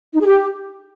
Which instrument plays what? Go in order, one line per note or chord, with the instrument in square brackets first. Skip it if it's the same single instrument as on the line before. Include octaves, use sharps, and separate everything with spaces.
[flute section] D#4
G#4
G4